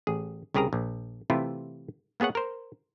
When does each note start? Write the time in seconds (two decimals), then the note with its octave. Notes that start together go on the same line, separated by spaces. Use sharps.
0.07 A1 G#4
0.54 C2 C#3 G4 G#4 A#4 A#5
0.73 A#1
1.30 C3 E3 A3 E4 F4 G4
2.20 A#3 B3 G#4 C#5 F#5
2.35 A#4 C5